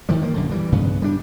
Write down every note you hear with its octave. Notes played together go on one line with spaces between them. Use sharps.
D#3 F3 G3
F3 A#3
A#1 F#2 D3
E3 G3
B1 G2 C#3 B3
G3 D4